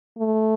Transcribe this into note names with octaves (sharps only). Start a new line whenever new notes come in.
A3